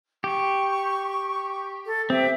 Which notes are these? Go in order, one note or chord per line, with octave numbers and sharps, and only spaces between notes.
G4 C#6
A4
C4 G4 E5 G5